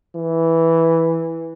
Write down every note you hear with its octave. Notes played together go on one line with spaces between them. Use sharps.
E3